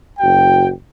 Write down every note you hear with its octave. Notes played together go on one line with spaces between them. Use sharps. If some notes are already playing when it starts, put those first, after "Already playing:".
F#1 F#4 G5